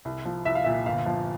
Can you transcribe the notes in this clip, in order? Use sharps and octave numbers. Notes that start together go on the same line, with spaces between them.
C2
F3
C2 E5
F5
A#2 E5
G1 F5
F3